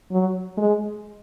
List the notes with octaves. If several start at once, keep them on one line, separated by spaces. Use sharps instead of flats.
F#3
G#3